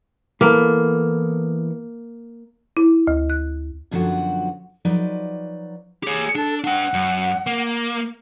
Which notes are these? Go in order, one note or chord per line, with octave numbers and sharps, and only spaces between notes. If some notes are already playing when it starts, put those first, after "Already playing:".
E3 A#3 B3 A4
E4
D2
F#6
F#2 D3 F3 F#3 B3 F#4
F3 F#3 D#4 B4 D5
G4 G#4 C#5
D4 A4
D4 F#5 G5
F#2
A#3